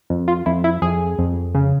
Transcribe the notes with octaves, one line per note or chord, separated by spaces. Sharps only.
F2
F4
F2 E4
E4
F2 G#4
F2
C#3